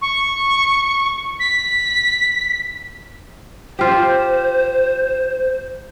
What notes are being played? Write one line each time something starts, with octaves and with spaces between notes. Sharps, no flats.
C#6
B6
F4 G4 C5